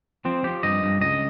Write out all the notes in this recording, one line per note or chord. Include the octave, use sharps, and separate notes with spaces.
F3 C4
F3 G4
G2 D#5
G2
C#2 D#5